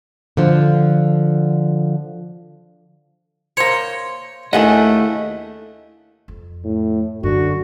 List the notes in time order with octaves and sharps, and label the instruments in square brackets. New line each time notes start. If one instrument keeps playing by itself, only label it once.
[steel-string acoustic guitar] D3 F3
[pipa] A#3 C5 [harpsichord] C#5
[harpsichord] D#2 [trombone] A3 [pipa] D4 G#4 F#5 [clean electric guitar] E4 D#5
[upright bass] F2
[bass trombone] A2
[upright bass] F#2 [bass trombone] D3 [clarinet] F#4